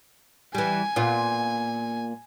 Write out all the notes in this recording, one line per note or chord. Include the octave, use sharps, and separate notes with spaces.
E3 G3 G#5
A#2 B3 F4